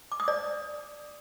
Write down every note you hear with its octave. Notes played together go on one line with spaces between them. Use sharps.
D6
D#6
D5